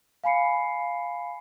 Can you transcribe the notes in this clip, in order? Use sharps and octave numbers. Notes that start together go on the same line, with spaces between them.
F5 G#5 B5 C7 C#7